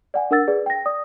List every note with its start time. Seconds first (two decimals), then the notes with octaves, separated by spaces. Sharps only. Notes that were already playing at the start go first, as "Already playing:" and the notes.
0.14 D5 F#5 G#5
0.31 D4 A#4 F#5 E6 A6
0.48 G#4 B4 D5
0.66 G5 A#6
0.85 D5 D#6